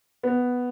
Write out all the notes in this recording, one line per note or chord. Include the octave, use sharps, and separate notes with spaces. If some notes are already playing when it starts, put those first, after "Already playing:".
B3